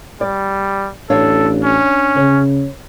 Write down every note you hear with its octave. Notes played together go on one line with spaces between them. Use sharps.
G3 D5
A1 D4 A4 C#5 F5
C#4
C#3 C#5